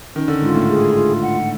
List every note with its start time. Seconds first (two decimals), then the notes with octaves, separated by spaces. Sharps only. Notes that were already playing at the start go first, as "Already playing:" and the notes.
0.15 D#3 C#4
0.28 D3
0.42 G#2 F4
0.54 A2
0.68 G#4
0.94 F4
1.21 F#5